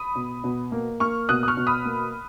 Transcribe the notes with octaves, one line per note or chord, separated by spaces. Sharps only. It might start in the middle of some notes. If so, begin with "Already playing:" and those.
Already playing: B5 D#6
B2
B2
A#3
A#3 C#6 F6
B2 D#6 F#6
D#6
C#6 F6
B2
B5 D#6
A#3